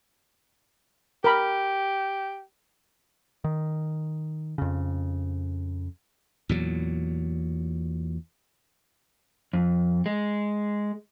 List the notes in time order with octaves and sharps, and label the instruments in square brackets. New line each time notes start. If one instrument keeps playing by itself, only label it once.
[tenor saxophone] G4 [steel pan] A#4 B5
[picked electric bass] D#3
F2 C#3
[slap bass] E2 A#2 F#3
[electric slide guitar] F2
G#3